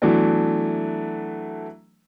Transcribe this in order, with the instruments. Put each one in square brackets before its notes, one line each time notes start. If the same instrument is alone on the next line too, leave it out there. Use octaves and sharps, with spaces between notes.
[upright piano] E3 F#3 A3 B3 D4